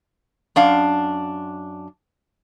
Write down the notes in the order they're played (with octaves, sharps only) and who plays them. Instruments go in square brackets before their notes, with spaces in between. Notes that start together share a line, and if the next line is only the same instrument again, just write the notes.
[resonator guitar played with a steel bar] F#2 D4 F5